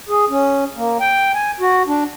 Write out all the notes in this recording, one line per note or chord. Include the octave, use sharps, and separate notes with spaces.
G#4
C#4
A#3
G5
G#5
F#4
D4